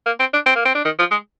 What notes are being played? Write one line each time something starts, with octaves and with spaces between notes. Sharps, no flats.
A#3
C4
D4
C4
A#3
C4
D4
D#3
F3
G#3